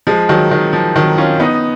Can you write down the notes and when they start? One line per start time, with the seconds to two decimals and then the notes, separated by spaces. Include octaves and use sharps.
0.07 F3 G#3
0.29 D#3 F#3
0.51 D#3
0.73 F3
0.96 D#3 F#3
1.18 C#4 F4
1.40 B3 D#4